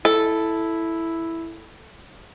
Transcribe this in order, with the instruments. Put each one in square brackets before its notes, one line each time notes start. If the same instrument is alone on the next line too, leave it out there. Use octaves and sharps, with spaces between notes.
[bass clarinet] E4 [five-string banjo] A4